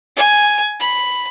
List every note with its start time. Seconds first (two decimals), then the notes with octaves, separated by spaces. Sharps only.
0.16 G#5
0.80 B5